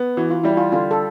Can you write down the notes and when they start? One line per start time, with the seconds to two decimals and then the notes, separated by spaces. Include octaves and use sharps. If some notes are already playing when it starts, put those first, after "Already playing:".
Already playing: B3
0.17 E3 F#4
0.31 F4
0.43 G3 E4
0.57 F4
0.72 D3 F4
0.91 A4